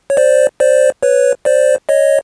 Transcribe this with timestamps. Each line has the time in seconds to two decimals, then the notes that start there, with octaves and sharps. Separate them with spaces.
0.10 C#5
0.17 C5 D5
0.60 C5 D5
1.03 B4 C#5
1.45 C5 D5
1.89 C#5 D#5